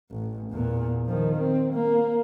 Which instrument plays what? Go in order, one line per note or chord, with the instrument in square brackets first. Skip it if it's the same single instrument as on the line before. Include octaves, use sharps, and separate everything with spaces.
[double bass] A1
E2 A#2
D#3 F3
C4
A#3